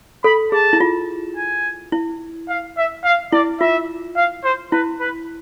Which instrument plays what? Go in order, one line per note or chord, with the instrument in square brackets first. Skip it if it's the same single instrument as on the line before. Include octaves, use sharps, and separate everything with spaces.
[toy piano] A4 [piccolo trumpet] B5
[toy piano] G#4 [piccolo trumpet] A5
[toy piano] E4
F4
[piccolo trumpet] G#5
[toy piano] E4
[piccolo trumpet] F5
E5
F5
[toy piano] E4 [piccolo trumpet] D5
[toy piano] F4 [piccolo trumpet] E5
[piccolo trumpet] F5
C5
[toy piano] E4 [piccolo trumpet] B4
[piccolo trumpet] B4